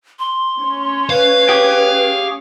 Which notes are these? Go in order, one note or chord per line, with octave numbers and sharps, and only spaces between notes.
C6
C#4 C#5
B4 F5
G4 G#4